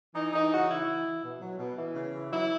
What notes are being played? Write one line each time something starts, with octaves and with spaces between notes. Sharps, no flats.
E3 D#4
E3 D#4
C#3 F#4
E3 E4
E3
E3
B2
F#3
B2
E3
C#3
E3
F#3 E4